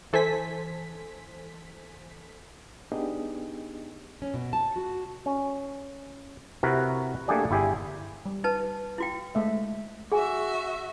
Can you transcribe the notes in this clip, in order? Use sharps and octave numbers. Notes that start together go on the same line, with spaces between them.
E3 A4 C5 G#5 B6
B3 D4 D#4 G4 G#4 D#5
C#4
B2
A5
F#4
C#4
C3 E4 F#4 A#4 B4
A3 A#3 D4 G4 G#4 D5
G1 E4 G4 G#4 G#5
G3
D#4 B4 A5
E4 F#4 G5
G#3 A3 E5
F#4 G#4 E5 G#5